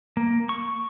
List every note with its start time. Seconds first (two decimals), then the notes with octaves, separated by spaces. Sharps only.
0.17 A#3
0.49 C#6